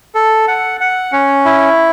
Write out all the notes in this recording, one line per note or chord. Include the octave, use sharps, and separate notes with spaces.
A4
F#5
F#5
C#4
E4